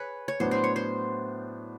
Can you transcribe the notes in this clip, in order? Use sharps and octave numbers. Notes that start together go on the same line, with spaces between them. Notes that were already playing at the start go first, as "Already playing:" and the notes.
Already playing: G#4 B4 C#5
C#5
A2 F#3 B3 D4 C5
C5
C#5
C5